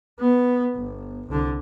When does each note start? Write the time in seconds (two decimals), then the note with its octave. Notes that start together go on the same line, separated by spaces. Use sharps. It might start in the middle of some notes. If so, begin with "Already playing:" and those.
0.20 B3
0.76 G1
1.27 C2 D3